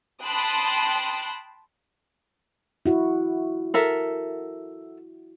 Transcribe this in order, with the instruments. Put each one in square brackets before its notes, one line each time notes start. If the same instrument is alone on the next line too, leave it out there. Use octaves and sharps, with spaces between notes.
[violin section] G5 A5 B5 C6 D#6 F#6
[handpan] E4 F#4
[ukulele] A4 A#4 E5